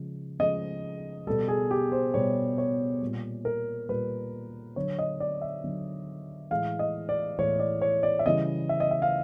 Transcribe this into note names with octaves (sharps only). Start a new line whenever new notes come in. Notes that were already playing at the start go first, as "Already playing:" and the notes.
Already playing: C#3 F3 G#3
C#3 F3 G#3 D#5
B2 G3 A4
G#4
G4
C5
B2 G3 C#5
C#5
A#2 G3
A#4
A#2 G3 B4
D3 F#3 C#5
D#5
D5
E5
D3 F#3
A2 E3 G#3 F5
D#5
D5
A2 E3 G#3 C#5
D5
C#5
D5
E5
C#3 E3 G3 D#5
E5
D#5
E5
F5